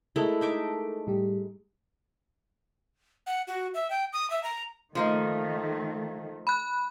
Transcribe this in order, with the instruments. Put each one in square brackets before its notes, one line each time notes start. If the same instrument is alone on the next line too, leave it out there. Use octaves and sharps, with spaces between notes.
[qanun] G#3 A3 E4 [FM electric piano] A4 A#4 A5
[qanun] D#4 E5 D6
[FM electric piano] A2 G3 G4
[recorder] F#5
F#4
E5
G5
D#6
E5
A#5
[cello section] D#3 A3 [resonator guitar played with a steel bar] F3 A#3 D#4
[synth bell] B5 F#6